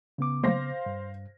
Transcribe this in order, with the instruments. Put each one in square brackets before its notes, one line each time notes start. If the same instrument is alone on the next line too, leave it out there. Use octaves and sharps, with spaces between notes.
[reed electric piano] C#3 B3 D6
[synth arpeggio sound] F#3 A3 A#3 [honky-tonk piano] C5 F5 A#6
[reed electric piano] G2